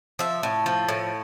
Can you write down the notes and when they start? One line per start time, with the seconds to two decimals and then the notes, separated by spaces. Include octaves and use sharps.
0.19 F3 E5
0.43 A2
0.66 F3
0.88 A2